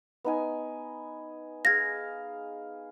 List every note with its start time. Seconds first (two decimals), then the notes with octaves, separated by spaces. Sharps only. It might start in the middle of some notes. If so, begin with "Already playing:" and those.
0.25 B3 D#4 G#5
1.65 G#4 F5 G#6 A#6